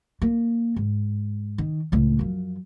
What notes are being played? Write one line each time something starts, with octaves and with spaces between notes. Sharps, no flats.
A#3
G#2
D#3
C#2 A2
F#2 F3